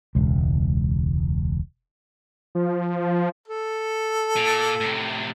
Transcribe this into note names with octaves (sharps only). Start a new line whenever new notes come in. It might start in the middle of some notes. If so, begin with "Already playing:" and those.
E1 C#2
F3
A4
A#2
A2 C3